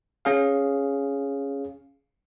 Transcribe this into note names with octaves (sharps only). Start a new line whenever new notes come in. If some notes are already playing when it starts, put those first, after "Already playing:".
C#4 G#4 F5